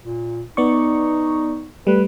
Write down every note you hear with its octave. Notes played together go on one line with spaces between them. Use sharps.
A#2
B3 D#4 D5 C#6
G3 A3 B4